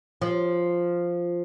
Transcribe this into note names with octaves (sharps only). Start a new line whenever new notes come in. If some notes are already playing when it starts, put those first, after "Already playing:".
F3